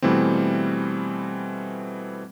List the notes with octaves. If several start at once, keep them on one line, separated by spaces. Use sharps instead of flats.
B2 E3 G3 A3 C4